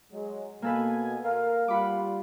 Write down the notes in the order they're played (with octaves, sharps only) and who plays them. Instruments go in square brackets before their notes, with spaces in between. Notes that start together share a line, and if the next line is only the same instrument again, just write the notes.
[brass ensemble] F#3 G#3
[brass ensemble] B2 [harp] A#3 A4 B4 [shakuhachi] G#5
[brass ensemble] A#4 [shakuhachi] F5
[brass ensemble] G3 F4 [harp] F#5 B5 D6